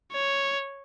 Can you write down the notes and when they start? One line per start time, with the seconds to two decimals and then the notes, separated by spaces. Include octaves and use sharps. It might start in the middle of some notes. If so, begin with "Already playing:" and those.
0.12 C#5